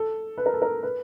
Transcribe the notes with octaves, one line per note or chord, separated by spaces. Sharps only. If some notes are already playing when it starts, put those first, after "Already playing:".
Already playing: A4
B4
A#4
A4
A#4
B4